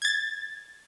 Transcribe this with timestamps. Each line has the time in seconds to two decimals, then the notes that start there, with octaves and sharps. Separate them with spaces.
0.02 G#6 A6